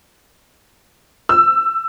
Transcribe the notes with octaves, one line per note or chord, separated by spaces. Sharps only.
E6